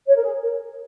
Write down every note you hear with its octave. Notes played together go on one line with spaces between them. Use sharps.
C#5
A#4
G#4
A#4